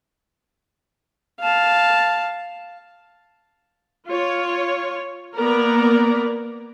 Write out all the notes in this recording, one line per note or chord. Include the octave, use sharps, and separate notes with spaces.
F5 A5
F4 C#5
A#3 B3 A#4 D5 A#5